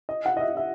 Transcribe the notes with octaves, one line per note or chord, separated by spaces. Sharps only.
D#5
F#5
D#5
E5
E5